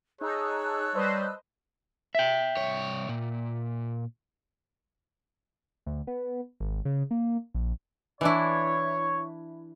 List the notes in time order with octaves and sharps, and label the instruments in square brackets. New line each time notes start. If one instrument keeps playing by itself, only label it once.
[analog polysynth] D#4 [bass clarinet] G#4 [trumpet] C#5 [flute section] A5 E6 F#6
[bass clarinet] G3 [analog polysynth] B4 C5 D#5
[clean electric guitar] E5 G5
[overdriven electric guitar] C2 C#5
A#2
[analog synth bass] D2
B3
G#1
C#3
A#3
A#1
[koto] E3 D4 E4 [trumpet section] C#5